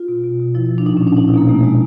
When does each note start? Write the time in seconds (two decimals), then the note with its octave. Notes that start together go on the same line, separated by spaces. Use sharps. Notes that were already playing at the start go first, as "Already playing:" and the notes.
Already playing: F4
0.08 B2
0.24 B2
0.40 B2
0.55 F3 E4
0.71 F3
0.78 D4
0.86 A#2 D#4
0.97 C#4
1.02 A#2
1.07 D4
1.17 B2 D#4
1.28 E4
1.33 B2 A#3
1.48 B2 A3
1.63 B2 G#3